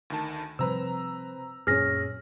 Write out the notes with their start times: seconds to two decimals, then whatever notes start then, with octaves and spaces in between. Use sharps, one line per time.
0.10 D2 D#3 A5
0.59 C3 F3 G3 C4 B4 A#5 E6
1.67 F#2 A#2 F#3 C#4 G#4 F6 A#6